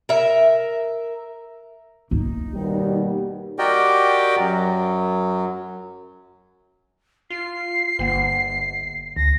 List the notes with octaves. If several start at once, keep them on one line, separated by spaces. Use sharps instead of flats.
A#4 E5
A#3 D#4
D#2 B2 G3
F#4 G4 A#4 D5 D#5 G5
F#2 F#3
F4 C7
G1 D3 A#3 F#5
D2 A#6